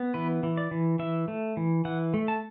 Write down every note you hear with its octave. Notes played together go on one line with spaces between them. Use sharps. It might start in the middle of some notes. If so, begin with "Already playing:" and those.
Already playing: B3
E3 B4
E3
D5
E3
E3 E5
A3
E3
E3 F#5
A3
A5